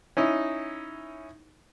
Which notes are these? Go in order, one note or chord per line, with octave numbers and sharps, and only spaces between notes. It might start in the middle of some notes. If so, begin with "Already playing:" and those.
C#4 D#4 E4